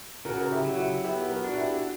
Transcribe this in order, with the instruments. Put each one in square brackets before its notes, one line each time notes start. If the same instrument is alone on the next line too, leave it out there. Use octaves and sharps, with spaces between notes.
[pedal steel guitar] C#3 [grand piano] F#4 A#4
[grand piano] A#4
E4 G4
[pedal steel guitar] F#3 [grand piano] F#4
[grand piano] E4 G4
[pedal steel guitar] B3 [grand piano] E4 G4
[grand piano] G4
F#4 A#4
[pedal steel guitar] D4 [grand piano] F#4
[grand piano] E4 G4
F#4